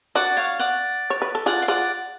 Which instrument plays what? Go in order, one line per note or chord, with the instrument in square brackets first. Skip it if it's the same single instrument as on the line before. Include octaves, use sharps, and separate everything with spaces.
[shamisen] D4 F#4 [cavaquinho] D5 F#5
[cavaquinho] C#5 F5
D5 F#5
[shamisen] C#5
B4
A4
[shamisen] F4 G#4 [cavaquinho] D5 F#5
[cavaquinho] F5
[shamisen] F4 G#4 [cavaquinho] D5 F#5